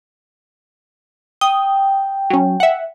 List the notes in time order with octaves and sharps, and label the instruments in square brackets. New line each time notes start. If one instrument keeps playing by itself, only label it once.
[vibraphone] G5 [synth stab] D#6
[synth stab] F#3 C#4
E5 F#5